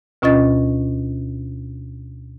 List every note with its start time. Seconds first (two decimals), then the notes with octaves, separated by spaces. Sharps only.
0.22 D2 B2 C#4 F4 D#5 A6